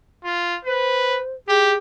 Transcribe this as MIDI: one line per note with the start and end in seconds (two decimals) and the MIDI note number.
0.24 0.56 65
0.65 1.18 71
0.65 1.34 72
1.48 1.75 67
1.48 1.75 68